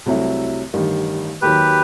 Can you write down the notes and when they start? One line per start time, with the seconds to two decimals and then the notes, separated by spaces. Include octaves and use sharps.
0.06 C2 C3 F#3 A3 E4
0.74 A1 G2 D#3 G3
1.42 D#2 D#3 F#3 G4 B4